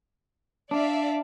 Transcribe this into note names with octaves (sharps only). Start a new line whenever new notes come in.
D4 D5 E5 F5